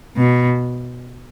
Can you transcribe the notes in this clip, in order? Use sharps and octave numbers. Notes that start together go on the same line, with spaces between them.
B2